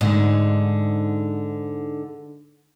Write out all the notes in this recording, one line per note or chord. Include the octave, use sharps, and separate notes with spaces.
G#2 D3